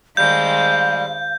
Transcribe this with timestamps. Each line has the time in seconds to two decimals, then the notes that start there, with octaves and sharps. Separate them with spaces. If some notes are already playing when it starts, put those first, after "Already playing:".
0.17 D#3 G3 G#3 C4 F5 G6